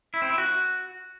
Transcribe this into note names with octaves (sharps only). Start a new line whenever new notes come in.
E4
C4
E4
F#4